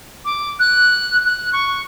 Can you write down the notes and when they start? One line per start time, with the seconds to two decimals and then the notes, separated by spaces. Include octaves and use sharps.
0.25 D6
0.59 F#6
1.25 F#6
1.53 C#6